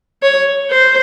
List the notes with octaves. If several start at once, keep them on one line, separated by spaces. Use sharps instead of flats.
C#5
C5